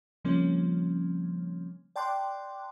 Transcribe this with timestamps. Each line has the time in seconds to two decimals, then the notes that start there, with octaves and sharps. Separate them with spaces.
0.25 C#3 F3 G3 A#3 C4 C#4
1.96 D5 G5 A5 C6 D6 F#6